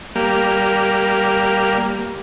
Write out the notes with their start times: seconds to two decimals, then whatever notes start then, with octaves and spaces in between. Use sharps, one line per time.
0.15 G3 A#3